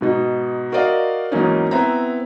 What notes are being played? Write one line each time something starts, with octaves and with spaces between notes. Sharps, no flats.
G#2 B2 D#4
F#4 A#4 C5 D5 D#5 F5
E2 G#2 F#3 A#3 C#4 D#4
B3 C4 E4 A#5